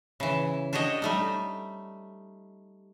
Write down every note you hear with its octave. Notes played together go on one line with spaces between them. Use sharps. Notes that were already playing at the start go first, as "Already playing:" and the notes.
C#3 E3
D4 F#4 G4 C#5 D#5
G3 A3 D#4